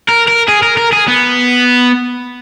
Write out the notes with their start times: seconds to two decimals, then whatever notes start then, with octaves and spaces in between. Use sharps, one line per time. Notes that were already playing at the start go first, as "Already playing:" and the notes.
0.09 A#4
0.28 A#4
0.49 G#4
0.63 A#4
0.78 A#4
0.93 G#4
1.08 B3